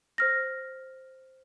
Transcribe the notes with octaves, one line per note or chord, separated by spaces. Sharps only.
C5 F6 A#6